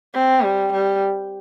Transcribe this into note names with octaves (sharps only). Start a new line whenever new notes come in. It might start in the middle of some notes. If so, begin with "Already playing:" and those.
C4
G3
G3